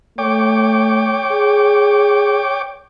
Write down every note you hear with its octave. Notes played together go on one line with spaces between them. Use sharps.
A3 C#5 G5 D6
G#4